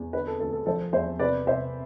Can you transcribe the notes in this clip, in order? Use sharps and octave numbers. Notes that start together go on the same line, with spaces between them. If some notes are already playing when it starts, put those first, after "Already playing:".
Already playing: E2
D3 B4
A4
D2 A4
A4
F3 A4 C5
E2 C5 E5
C3 B4 D5
C2 C5 E5